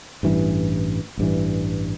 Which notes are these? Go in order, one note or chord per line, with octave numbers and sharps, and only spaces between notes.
A1 G2 E3
A1 G2 E3